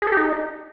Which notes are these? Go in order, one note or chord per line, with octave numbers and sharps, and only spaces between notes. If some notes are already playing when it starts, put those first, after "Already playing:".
G#4
A4
G4
D#4